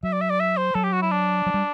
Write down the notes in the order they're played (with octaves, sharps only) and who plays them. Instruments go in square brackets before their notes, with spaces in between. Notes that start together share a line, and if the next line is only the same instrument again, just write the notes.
[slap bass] F#3 [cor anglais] E5
[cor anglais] D5
E5
D5
E5
C5
[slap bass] F#3 [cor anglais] A4
[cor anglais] G4
F#4
E4
D4
[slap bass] F#3
G3